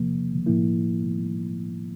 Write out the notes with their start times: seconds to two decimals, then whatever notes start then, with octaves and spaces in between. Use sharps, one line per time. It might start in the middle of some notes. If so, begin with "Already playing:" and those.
Already playing: E2 C3 F3 A#3
0.46 A2 F3 A#3 E4